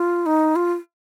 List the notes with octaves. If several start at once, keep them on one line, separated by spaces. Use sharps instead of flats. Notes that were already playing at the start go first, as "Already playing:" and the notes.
Already playing: F4
D#4
F4